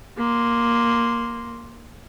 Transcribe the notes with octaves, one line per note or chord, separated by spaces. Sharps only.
A#3 C6